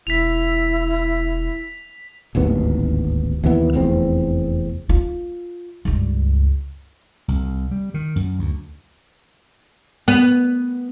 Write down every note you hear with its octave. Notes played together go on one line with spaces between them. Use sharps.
E1 E4 B6 F7
D1 G#1 D#2 B3
D#2 C3 E3 B3
F1 E2 C4
F4
C#2 G2
C2
G3
D#3
F#2
D2
B3